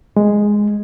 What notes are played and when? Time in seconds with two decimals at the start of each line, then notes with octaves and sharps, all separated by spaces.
0.17 G#3